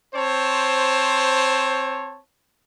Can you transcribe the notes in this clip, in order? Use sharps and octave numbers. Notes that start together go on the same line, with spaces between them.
C4 C5 C#5 A5